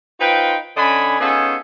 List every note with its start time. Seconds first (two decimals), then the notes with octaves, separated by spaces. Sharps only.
0.20 D#4 F4 B4 C5 G5
0.77 D3 C#4 D4 D#5 G#5 B5
1.20 B3 C#4 D#4 F4 G#4 A4